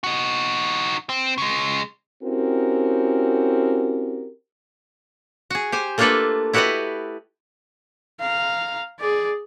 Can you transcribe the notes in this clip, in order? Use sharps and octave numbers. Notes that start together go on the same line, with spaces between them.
D#4 F#4
C4
C#3 G#3
C4 C#4 E4 F#4 G4 A#4
F#4 G#4
G4 C5 G#5
A3 A#3 D4 F4 A4 B4
E4 F#4 G4 B4 D5 D#5
F5 A#5
G#4 D5